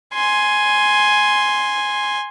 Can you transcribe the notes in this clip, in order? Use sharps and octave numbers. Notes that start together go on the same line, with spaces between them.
G#5 C6